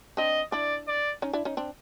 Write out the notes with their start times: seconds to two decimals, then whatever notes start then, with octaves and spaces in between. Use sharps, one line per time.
0.17 C4 D4 D#5
0.52 D4 E4 D5
0.88 D5
1.22 C#4 D#4
1.33 D4 E4
1.45 C#4 D#4
1.57 C4 D4